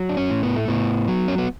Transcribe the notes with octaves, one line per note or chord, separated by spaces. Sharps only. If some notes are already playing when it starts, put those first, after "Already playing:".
Already playing: F#3
D4
C#4
A2
B3
A3
A2 B3
F#3
C#4
B3